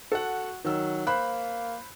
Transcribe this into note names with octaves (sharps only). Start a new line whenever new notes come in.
F#4 A4 F#5
D#3 F#3 E6
A#3 C5 B5 F#6